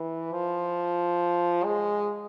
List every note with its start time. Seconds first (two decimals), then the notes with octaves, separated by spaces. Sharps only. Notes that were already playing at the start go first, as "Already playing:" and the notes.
Already playing: E3
0.33 F3
1.64 G#3